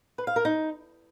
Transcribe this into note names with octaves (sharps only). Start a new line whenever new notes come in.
B4
F5
A#4
D#4